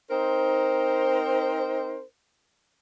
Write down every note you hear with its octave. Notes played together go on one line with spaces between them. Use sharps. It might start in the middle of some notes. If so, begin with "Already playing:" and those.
C4 D#4 A#4 C5